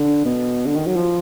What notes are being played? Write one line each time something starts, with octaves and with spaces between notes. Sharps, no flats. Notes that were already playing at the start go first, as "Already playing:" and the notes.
Already playing: D3
B2
D3
D#3
F#3
F3